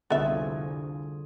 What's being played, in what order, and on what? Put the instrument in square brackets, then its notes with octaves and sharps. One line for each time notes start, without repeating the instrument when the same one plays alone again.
[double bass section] C2 F2 [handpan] D3 F4 G#4 [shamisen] B3 E5